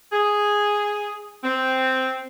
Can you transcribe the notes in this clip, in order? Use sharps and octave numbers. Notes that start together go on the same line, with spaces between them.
G#4
C4